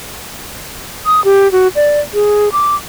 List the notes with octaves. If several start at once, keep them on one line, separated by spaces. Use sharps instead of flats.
D#6
G4
F#4
D5
G#4
D6